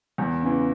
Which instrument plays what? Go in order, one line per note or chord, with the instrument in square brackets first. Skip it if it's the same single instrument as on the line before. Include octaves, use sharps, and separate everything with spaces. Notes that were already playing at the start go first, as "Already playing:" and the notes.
[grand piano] E2
C#3 E3